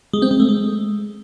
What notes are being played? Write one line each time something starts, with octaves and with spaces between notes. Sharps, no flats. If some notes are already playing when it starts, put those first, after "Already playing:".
G#3
C4
G#3
A3
G#3